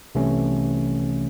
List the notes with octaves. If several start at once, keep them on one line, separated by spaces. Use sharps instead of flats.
C2 C3 E3 A3 C#4